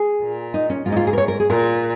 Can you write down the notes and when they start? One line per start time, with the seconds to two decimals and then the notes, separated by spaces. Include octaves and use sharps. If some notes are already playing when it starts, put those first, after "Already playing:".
Already playing: G#4
0.22 A#2
0.54 D#4
0.70 C#4
0.85 G#2 F4
0.92 D#4
0.97 F4
1.07 G#4
1.13 A#4
1.18 C#5
1.28 A#4
1.40 G#4
1.49 A#2 A#4